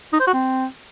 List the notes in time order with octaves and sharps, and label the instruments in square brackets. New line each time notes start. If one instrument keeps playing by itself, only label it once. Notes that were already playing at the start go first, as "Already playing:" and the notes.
[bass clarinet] D#4
C5
F#4
C4